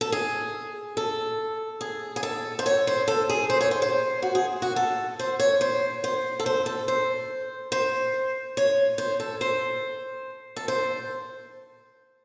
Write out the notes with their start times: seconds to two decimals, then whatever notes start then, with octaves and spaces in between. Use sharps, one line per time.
0.01 A4
0.12 G#4
0.97 A4
1.81 G#4
2.16 G#4
2.23 A4
2.59 C5
2.66 C#5
2.87 C5
3.08 A4
3.29 G#4
3.50 C5
3.61 C#5
3.71 C5
3.82 C5
4.22 F#4
4.35 G#4
4.62 F#4
4.76 A4
5.19 C5
5.39 C#5
5.61 C5
6.04 C5
6.40 A4
6.46 C5
6.66 A4
6.88 C5
7.72 C5
8.57 C#5
8.98 C5
9.20 A4
9.41 C5
10.56 A4
10.68 C5